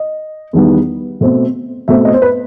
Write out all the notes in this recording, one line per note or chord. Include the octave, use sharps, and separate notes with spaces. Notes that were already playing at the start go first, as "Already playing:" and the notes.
Already playing: D#5
E2 D#3 G3 B3
B2 A3 C4
B2 A3 C4 E5
D#5
C5
B4